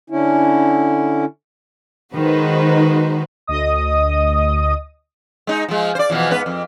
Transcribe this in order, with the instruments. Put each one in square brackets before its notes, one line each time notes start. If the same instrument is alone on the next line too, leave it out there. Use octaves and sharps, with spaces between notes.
[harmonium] D3 C#4 E4
[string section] D#3 G#3 D#4 F#4 B4 C5
[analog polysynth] D2 D#5 D#6
[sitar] G#3 D#4
F3 G#3
C5 D5
B2 E3 F3
G#2 B3 B4
F2